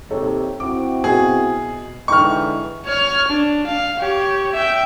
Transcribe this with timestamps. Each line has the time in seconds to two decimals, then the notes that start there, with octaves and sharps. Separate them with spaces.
0.10 D#2 C3 D#4 A4 C#5
0.60 C4 E4 F#4 D6
1.04 B2 G#4
2.08 D3 E3 G#3 D#4 G5 C#6 F6
2.86 C#5 F6
3.28 D4
3.67 F5
4.00 G4 C#5
4.52 E5 G5